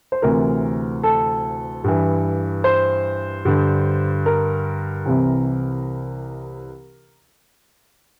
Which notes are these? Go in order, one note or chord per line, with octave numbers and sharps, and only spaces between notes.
C5
D2 C3 E3 A#4
A4
G2 E3
C5
G2 D3
A#4
C2 C3 E3